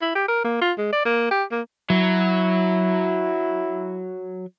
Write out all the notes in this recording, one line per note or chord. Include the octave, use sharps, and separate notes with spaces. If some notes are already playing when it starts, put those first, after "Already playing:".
E4
G4
A#4
A#3
F4
G#3
D5
A#3
G4
A#3
F#3 E4